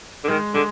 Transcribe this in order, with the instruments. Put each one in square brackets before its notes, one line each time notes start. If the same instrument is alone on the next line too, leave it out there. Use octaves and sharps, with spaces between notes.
[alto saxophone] D3
[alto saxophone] D#3 [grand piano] G#3
[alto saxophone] D3 [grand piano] G#3